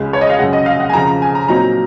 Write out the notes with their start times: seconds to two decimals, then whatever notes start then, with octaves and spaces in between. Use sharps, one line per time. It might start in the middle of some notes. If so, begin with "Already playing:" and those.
Already playing: C#2 C#3 G#3
0.13 C#5
0.21 D#5
0.30 F5
0.39 F#2 C#3 G#3 F#5
0.53 D#5
0.66 F5
0.80 F#5
0.89 G#5
0.93 F2 C#3 F3 A#5
1.07 A#5
1.22 G#5
1.35 A#5
1.48 A#2 F#3 C4 D#4 A#5